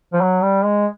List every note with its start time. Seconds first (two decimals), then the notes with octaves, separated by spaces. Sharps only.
0.13 F3
0.21 F#3
0.42 G3
0.64 G#3